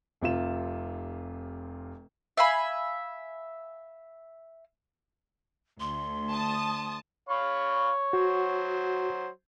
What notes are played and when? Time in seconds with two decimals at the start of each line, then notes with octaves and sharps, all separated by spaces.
0.21 F1 C3 F4 E7
2.37 E5 F5 G#5 B5
5.80 D2 C6
6.30 A5 D#6
7.29 C#5 F5 B5 C#6
8.13 F#3 F#4 C5